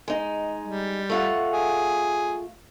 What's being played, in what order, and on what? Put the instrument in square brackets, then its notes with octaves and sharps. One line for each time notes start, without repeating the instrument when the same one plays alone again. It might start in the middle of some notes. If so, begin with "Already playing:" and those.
[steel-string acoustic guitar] G#3 D#4
[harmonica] G3
[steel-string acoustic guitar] A3 F4 F#5
[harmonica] G#4